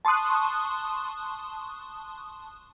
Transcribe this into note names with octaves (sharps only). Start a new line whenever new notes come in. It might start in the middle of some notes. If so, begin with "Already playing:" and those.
A5 C6 C#6 D#6 F#6